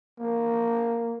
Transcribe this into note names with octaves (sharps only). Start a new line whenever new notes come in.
A#3